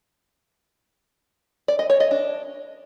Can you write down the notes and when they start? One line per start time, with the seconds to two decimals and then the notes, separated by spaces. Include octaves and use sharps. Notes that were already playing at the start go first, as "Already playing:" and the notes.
1.68 D5
1.79 D#5
1.90 C#5
2.00 D#5
2.11 D4